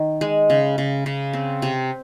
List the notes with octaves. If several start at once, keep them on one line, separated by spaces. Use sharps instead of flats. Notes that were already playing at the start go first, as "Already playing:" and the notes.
Already playing: D#3
G#3
C#3
C#3
C#3
C4
C3